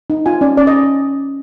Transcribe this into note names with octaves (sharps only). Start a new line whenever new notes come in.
D#4
F4 G#5
C#4 D5
C#4 D5
D#5